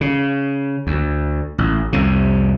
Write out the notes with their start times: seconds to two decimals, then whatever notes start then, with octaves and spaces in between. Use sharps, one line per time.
0.01 C#3
0.87 D2
1.58 A1
1.93 C2 F2 C3